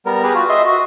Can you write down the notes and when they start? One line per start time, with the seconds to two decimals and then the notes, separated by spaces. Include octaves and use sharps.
0.06 G3 B3 A#4
0.23 G4 G#4 B4
0.35 F4 F#4
0.49 D#5 E5 C6
0.66 F#4